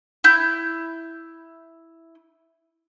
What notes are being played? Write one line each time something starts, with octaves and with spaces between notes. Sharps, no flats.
E4 G6